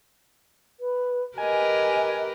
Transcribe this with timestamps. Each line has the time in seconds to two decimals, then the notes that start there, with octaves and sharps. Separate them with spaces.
0.80 B4
1.38 G4 A#4 B4 D#5 G#5